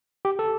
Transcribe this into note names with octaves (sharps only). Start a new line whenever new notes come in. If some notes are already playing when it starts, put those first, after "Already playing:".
G4
A4